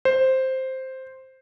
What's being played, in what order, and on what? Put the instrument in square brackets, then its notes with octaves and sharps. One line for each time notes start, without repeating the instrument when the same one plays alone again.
[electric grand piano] C5